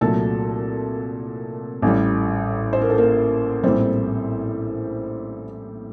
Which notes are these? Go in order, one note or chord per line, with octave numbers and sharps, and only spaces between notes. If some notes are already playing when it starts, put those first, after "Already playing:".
C2 A#2 F#3 A3 A4
A1 A2 G3
C5
A#4
A4
A#3 A#4
A#1 A2 G3 C4 C5